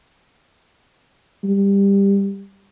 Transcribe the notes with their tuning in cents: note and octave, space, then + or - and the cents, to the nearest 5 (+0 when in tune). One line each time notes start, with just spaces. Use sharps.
G3 +20